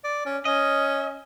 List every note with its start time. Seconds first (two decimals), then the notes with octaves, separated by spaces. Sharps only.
0.04 D5
0.26 C#4
0.45 C#4 D#5